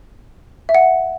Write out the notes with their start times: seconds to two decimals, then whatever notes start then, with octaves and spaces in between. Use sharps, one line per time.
0.69 E5
0.75 F#5